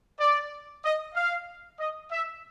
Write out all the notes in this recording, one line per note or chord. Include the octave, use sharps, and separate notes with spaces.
D5
D#5
F5
D#5
E5